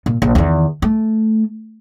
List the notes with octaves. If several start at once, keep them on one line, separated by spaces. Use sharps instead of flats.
A#2
A#1
E2 D#3
A3